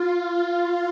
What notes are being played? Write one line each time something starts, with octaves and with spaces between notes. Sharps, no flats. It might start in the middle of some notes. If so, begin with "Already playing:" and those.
Already playing: F4